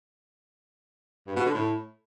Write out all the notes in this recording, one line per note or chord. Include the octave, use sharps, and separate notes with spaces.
G2
B2
D3
A2